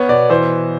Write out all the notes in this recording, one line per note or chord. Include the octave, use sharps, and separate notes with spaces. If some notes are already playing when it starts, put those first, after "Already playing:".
Already playing: B3 C#5
B2 D5
E3 C5